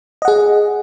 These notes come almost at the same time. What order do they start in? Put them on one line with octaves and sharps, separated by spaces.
D#5 F#5 G#4